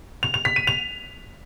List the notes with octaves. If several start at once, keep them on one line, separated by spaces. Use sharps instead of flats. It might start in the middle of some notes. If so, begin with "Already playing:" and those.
F7
F7
B6
D#7
F7